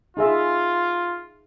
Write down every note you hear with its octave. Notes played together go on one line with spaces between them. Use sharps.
D#4 F4 G#4 E5